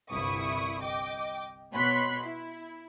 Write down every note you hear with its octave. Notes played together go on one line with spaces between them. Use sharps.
G1 C2 E4 C#6 D#6
D#5 G5 D6
B2 C#5 B5 C6 F#6 B6
E4